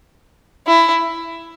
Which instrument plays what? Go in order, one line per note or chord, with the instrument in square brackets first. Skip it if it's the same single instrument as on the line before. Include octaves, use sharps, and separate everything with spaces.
[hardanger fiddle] E4